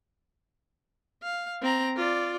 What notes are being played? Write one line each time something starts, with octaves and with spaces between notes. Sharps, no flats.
F5
C4 A#5
F4 D5